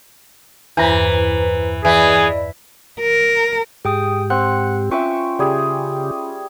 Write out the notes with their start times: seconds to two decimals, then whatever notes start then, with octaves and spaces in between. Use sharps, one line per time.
0.77 E2 G2 E3 B4 C5 A#5
1.85 E3 G#4 D5 D#5 B5
3.01 A#4
3.85 G#2 G4 G#4 G5 D#6
4.30 C4 F#5 F#6
4.91 C#4 F4 E5 G5 C#6
5.39 C#3 G3 G4 G#4